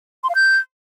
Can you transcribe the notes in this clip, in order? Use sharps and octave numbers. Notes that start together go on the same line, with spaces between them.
C6
F5
G6